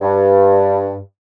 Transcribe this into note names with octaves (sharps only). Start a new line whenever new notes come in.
G2